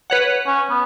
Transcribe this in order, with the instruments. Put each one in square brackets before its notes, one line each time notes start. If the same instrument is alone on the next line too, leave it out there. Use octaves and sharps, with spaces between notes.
[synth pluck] B4 C#5 F#5
[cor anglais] C#4
B3